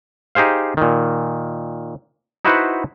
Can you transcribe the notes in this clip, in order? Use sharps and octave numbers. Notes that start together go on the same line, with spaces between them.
D#4 G4 G#4 C5 F5
A#2 D#3
D#4 E4 F#4 B4 C5 F#5